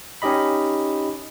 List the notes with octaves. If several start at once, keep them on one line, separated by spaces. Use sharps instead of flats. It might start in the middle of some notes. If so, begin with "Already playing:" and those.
C#4 D#4 G4 D#5 B5